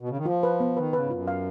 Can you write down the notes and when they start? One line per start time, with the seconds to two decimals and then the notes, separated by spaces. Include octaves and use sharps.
0.01 B2
0.09 C#3
0.17 D#3
0.25 F3 F4
0.43 B4
0.60 B3
0.76 D#3 B4
0.93 C#3 B4
1.03 G#2
1.10 F#2 F4
1.28 F5